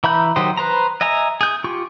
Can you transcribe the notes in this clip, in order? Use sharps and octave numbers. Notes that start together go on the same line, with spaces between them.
E3 E5 A#5 B5 G6
D#3 F#3 G4 C5 D#5
B4 C5 A#5
D#5 E5 G#5 A#5
G#4 G6
F4 G4 C#6